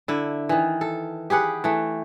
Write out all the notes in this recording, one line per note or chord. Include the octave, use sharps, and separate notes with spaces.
D3 E4
D#3 E3
A4
G4 G#4 B4 F#5
E3 A3